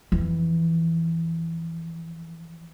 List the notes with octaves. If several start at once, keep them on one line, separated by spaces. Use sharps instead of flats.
F2 E3